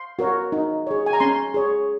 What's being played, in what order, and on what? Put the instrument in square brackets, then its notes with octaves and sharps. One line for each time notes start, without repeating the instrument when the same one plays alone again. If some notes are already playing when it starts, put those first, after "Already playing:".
Already playing: [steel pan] C6
F#4 A#4 C#5
D#4
G#4 C#5
G#5
A#5
C#4 C6
G#4 C#5